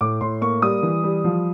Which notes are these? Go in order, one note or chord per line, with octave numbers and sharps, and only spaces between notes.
A2 D6
A2 C6
A#3 C#6
G3 D#6
E3
G3
F3